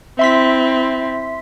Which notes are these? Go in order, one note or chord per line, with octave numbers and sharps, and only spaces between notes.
C4 E4 E5 C6 B6